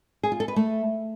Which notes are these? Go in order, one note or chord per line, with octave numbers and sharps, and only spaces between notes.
G#4
F4
A4
B4
A3